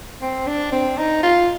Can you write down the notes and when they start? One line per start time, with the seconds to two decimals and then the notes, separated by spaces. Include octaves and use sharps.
0.22 C4
0.47 D4
0.72 C4
0.98 D#4
1.23 F4